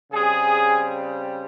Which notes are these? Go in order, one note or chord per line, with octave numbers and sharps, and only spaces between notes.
C#3 G3 C4 G#4